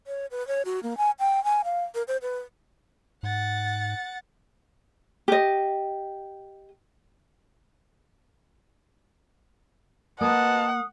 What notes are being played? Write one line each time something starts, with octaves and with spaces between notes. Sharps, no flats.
C#5
B4
C#5
F#4
A#3
G#5
G5
G#5
F5
A#4
C5
B4
G#2 F#5 A6
G4 D#5
A#3 B4 D#5 F#5 A5 D#6